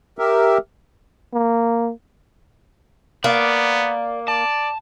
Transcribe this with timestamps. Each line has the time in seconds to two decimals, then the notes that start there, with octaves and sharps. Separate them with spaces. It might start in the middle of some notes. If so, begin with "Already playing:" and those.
0.19 G4 A#4 E5
1.33 A#3
3.24 A#3 B3 D5
4.28 D5 A5